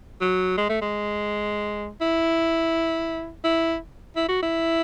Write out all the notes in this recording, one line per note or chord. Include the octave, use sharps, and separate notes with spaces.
F#3
G#3
A3
G#3
E4
E4
E4
F#4
E4